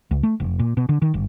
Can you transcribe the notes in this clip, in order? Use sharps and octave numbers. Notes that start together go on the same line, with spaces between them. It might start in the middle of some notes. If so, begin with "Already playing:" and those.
C#2
A3
F1
A#2
B2
D3
D#3
G1